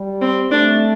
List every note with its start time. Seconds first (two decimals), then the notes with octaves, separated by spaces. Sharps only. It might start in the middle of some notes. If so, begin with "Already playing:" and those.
Already playing: G3
0.21 C4
0.51 A3 D4